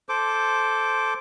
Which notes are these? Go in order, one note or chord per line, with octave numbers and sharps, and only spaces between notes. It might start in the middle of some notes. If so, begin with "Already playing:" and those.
A4 C5 D6